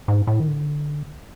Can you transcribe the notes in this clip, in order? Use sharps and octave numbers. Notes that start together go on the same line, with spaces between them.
G#2
A2
D#3
D3